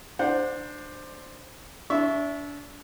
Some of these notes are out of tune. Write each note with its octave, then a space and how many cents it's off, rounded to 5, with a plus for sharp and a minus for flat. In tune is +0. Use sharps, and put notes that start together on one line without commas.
D4 +20 C5 +0 F#5 -25
D4 -30 E5 +0 C#6 +0